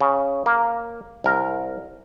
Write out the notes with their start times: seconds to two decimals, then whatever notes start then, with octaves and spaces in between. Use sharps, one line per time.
0.01 C#3
0.46 A#3
1.24 C2 A#4